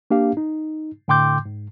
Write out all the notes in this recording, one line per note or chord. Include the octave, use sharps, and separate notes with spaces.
A#3 D4 G4 F5
D#4
A2 D3 G5 C6 D6 G6
G#2